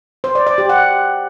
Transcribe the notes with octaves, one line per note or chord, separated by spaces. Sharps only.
C5
D5
D5
G4
F#5